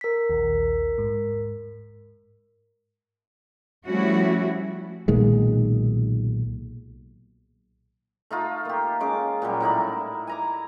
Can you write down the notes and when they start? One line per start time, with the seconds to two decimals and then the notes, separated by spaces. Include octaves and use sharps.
0.01 A#4 B6
0.30 A#1 D#2
0.98 G#2
3.86 F3 G3 A3 C#4 E4 F#4
5.08 B1 A#2 D#3 G#3
8.31 A3 D#4 F4
8.65 A#3 G4
9.00 G#3 C#4 D6
9.42 A#2 F#3 G3
9.61 A2 D#4 E4 D5
10.27 G#5 A#5 D6